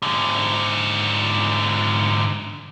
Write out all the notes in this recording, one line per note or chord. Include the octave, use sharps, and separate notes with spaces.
G#2 D3